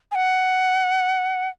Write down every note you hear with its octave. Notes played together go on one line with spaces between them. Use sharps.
G#5
F#5